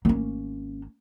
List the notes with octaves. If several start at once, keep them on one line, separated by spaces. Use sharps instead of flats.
G#1 A#3 C#4